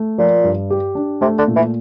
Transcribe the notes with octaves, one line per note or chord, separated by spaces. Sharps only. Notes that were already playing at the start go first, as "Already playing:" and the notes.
Already playing: A3
A#2 F3
G2
G4
D4
C3 A3
D3
A#2
E3